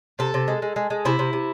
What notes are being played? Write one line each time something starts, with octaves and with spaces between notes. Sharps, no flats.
C3 A4
C3
G#3
G#3
G#3
G#3
C3 E4
C3
C3